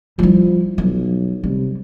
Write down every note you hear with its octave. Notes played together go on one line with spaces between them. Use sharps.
F3 G3 E4
B1 F#3
C3 G3